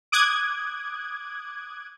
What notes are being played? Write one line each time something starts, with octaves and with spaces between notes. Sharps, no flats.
D6 D#6 F#6 G#6